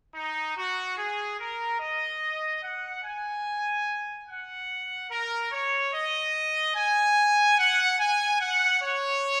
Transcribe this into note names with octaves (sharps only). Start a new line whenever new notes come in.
D#4
F#4
G#4
A#4
D#5
F#5
G#5
F#5
A#4
C#5
D#5
G#5
F#5
G#5
F#5
C#5